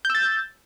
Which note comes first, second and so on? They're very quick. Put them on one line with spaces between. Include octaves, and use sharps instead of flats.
G6 E6 A6